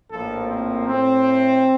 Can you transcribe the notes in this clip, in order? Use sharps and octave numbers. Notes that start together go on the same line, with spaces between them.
A#1 A2 F3 A#3 A4
C4
A2 A3 C4